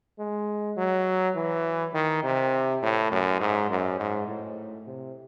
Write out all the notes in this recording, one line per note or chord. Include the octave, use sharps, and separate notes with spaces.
G#3
F#3
E3
D#3
C3
A2
F#2
G#2
F#2
G#2
A2
C3